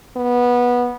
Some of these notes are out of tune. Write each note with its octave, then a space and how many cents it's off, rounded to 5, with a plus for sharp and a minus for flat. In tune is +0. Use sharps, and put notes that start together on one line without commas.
B3 -15